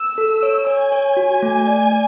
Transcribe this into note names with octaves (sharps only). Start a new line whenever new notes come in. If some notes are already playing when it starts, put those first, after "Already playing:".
Already playing: E6
A4
C#5
C#5 G#5
C#5
F#4
A3
D5
D5